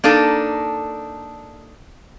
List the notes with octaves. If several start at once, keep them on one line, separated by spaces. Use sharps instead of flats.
A#3 D4 D#4 A4